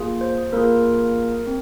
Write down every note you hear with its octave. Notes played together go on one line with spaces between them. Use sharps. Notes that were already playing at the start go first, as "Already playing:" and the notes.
Already playing: A#3 F4 G#4
C5
A#3 F4 G#4 A#4
C4